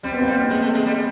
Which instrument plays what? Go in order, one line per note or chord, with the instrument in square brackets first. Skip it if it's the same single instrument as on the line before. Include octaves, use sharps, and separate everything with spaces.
[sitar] G3 [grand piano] C4
[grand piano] B3
A#3 C4
[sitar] G3
G#3
A3
G#3
G3